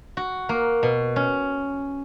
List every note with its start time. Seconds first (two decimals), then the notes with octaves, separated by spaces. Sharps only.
0.17 F#4
0.49 A#3
0.83 B2
1.16 C#4